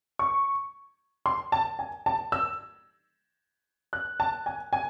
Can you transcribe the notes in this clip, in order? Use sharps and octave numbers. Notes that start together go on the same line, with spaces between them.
C#6
C6
A5
G#5
A5
E6
F#6
A5
G#5
G#5